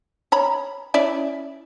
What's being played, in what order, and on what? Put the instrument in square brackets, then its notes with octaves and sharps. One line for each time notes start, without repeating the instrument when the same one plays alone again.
[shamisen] C#5 A#5 B5
C#4 E4 D5